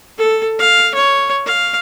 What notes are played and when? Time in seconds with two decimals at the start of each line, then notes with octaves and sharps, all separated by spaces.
0.18 A4
0.59 F5
0.95 C#5
1.46 F5